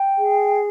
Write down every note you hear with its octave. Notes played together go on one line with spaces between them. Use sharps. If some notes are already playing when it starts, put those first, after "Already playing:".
Already playing: G5
G#4